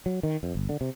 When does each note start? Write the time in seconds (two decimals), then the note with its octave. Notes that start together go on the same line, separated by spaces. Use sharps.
0.06 F#3
0.23 D#3
0.43 F2
0.55 G1
0.69 D3
0.81 C3